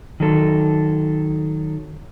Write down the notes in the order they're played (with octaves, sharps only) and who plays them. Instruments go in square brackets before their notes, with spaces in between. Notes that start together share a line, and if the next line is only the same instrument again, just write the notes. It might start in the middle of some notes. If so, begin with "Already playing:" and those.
[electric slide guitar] D#3 F#3 A4